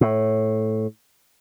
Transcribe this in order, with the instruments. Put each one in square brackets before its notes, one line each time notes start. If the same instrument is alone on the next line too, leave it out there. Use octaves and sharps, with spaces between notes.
[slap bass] A2